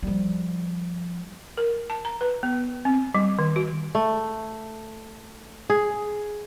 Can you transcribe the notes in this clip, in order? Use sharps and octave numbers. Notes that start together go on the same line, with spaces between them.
F3 G3
A#4
A5
A#5
B4
B3
C4
G3
D#3
F#4
A3
G#4